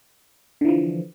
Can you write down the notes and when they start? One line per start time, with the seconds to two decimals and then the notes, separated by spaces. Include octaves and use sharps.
0.61 D3
0.65 E3
0.68 F3